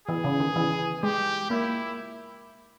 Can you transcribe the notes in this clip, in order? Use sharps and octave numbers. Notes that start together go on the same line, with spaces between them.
E3 G#4
C#3
D#3
E3
G#3 G4
A#3 E4